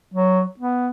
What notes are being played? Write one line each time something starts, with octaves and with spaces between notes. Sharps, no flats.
F#3
B3